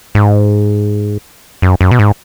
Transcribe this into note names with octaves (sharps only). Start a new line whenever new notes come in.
G#2
F#2
F#2
B2
G#2